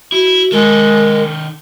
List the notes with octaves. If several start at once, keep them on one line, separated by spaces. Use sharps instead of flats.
E4 F#4
D#3 G#3 A4 A#4